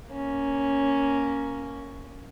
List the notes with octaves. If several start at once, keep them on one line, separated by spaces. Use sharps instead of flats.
A#3 C#4